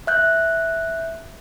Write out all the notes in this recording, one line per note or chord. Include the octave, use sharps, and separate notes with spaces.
E5 F#6 G6